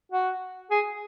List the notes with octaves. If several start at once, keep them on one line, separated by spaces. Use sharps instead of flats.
F#4
G#4